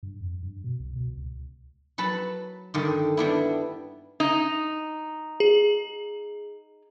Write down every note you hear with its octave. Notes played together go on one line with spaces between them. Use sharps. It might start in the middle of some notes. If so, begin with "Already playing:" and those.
G2
F2
G2
B2
C2
B2
C#2
F#3 B4 A5 B5
G2 D3 D#3
G3 B3 D4 E4
D#4
G#4